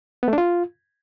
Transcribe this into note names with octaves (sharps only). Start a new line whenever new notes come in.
B3
A3
D4
F4